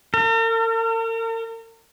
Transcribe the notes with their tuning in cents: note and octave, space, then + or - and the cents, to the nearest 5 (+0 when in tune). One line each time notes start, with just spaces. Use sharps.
A#4 -45